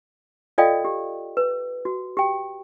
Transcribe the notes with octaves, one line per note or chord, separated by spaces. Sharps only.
F4 A4 D5 D#5 F5 G5
G4
B4
F#4
G4 G5